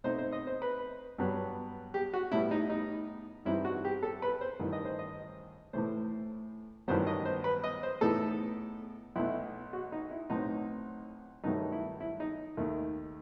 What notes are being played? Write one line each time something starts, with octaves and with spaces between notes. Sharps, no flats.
B2 A3 C4 D#4 C5
C5
D#5
C5
B4
G2 F#3 B3
G4
F#4
A2 G3 B3 E4
D#4
D#4
G2 E3 G3 C4 D#4 E4
F#4
G4
A4
B4
C5
A1 G2 D#3
D#5
C5
D#5
A2 E3 A3 C5
A1 G2 D#3 F#3 B3 C5
D#5
C5
B4
D#5
C5
A2 E3 B3 D#4 A4
B1 B2 A3 E4
F#4
D#4
E4
B1 A2 F#3 C4 D#4
G2 D#3 F#3 A3 D#4
E4
E4
D#4
D#2 D#3 A3